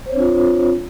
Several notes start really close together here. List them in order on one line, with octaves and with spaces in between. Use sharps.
C5 C#5 C4 D4 F4